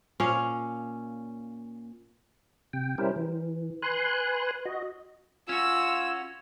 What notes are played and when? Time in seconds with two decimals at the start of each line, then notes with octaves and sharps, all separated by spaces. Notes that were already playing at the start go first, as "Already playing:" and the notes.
0.20 A#2 C#4 F5
2.73 C3 G5
2.98 G3 C#4 E4 G4 A#4 C5
3.16 E3
3.82 B4 G#5 C6 F#6
4.65 F#4 D#5
5.49 C#4 F4 F#4 E6